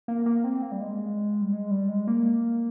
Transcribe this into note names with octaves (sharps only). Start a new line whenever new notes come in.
A#3
A#3
C4
A#3
G3
G#3
G3
G#3
G3
G#3
A#3